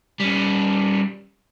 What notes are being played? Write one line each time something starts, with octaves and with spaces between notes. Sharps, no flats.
G3 C#4